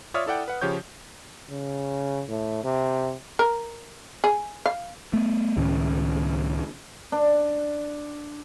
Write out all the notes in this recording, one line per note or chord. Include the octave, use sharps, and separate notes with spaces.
F4 C#5 D5 E5 D#6 F6
E4 A4 D5 F#5 G5
B4 F#5
C#3 F3 G4 C#5 G6
C#3
A2
C3
A#4
G#4
F5
A3 B3
C#2 A2 D#3 C#4
D4